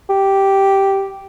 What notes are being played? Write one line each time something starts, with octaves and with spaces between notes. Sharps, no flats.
G4